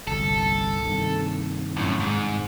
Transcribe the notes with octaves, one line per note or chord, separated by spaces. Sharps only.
G1 C2 A4
G2 C3 D#3
F#2 A2
G#2